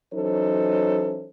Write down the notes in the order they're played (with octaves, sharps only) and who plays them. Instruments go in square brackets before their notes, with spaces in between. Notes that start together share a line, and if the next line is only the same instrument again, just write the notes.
[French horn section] E3 F#3 C#4 D#4 A4 C5